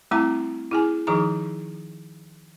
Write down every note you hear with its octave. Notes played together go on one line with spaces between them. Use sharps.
G3 A3 C4 E4 F#5 A#5
E4 G#4 G#5
D#3 F3 D#4 G#4 A#5